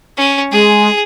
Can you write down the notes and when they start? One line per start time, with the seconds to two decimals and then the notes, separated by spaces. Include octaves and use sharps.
0.17 C#4
0.52 G#3 G#4